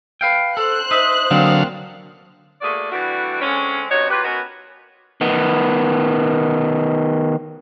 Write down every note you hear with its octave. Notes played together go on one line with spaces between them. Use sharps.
B4 F5 G5
A4 C5 F#6
D#4 D#5 E5 D#6
D3 F#3 A#3 C4 F5
A3 A#3 F#4 G#4 D5
E3 G3 A3 D4 F#4
D3 G#3 C4 C#4
G2 C3 D#4 F#4 C#5
F#3 F4 G4 B4
B3 C#4 D#4 F#4 A#4 B4
D#3 B3